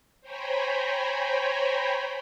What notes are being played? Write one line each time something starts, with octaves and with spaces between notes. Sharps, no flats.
C5 C#5 G5 G#5 A#5 B5